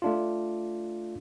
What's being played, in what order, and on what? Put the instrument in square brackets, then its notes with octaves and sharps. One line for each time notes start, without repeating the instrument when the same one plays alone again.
[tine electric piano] A3 D4 F4